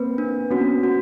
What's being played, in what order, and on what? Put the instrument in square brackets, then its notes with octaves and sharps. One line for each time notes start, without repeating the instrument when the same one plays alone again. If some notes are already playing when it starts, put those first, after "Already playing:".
Already playing: [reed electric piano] A#3 C4 [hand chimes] B4
[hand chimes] D4
[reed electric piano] B3 C#4 [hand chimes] F#4
[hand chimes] F#4